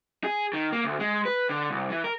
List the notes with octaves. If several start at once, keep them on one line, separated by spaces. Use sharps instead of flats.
G#4
D#3
A#3
D2
G#3
B4
D3
C2
E3
A#4